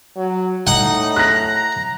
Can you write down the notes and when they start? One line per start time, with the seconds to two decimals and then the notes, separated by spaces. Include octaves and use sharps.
0.17 F#3
0.67 A2 D#4 F#5
1.16 A#5 F#6 A#6